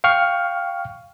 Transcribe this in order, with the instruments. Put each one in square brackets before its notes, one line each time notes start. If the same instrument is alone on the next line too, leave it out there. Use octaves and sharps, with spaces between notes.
[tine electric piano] F5 G5 C#6 F6